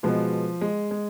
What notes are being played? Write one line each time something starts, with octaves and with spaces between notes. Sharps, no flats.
B2 F3 G#3 B3
G#3
G#3